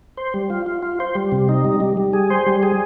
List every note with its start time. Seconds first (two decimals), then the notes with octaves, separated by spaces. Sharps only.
0.17 C5
0.34 G3
0.50 F4
0.66 F4
0.83 F4
1.00 C5
1.15 G3
1.32 C3
1.49 D#4
1.64 G3
1.80 G3
1.97 G3
2.13 G#4
2.30 C5
2.47 G3
2.63 G#4